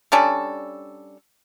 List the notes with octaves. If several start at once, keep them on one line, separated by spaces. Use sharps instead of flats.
G3 C#4 D4 A4